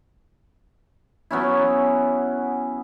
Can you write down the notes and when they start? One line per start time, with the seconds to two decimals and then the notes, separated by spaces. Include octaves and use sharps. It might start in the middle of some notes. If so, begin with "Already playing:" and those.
1.31 F#3 B3 C#4 E4